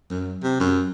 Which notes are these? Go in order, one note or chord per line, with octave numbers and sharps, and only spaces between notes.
F#2
C3
F#2